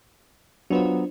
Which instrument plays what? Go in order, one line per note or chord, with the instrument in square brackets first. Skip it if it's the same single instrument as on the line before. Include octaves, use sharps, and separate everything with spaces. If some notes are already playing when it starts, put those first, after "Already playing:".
[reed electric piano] F#3 B3 [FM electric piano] D4 F4 C5